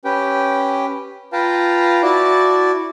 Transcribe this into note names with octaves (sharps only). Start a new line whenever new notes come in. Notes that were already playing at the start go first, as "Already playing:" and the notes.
C#4 G4 B4 G5
F4 B4 F5 G5 A5 A#5
E4 F#4 D5 A5 D6